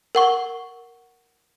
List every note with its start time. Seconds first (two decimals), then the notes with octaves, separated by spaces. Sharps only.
0.15 A#4 F#5 C#6